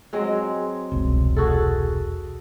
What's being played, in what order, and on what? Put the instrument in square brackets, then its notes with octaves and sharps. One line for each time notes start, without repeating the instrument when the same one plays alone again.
[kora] F#3 G#3 C4
[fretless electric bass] E1 C2
[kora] F#4 G#4 A4